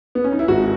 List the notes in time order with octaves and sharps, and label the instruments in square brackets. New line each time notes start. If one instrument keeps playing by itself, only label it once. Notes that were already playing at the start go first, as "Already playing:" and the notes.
[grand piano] B3
C#4
D#4
E4
G#1 F#4